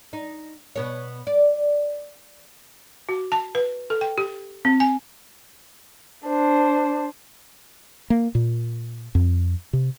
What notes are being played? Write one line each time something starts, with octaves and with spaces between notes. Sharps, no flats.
D#4
B2 B3 C#5
D5
F#4
A5
B4
A4
G5
G4
C4
G#5
D4 C5
A#3
A#2
F2
C3